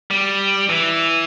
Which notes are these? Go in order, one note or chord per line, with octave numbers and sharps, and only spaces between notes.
G3
E3